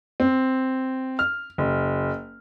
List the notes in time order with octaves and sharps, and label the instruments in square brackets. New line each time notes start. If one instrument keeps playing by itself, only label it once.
[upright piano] C4
F6
F#1